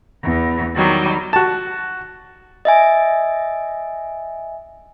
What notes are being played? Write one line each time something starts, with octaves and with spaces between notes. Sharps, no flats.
E2
D#3 F#3 G3
F#4 A5
D#5 E5 G#5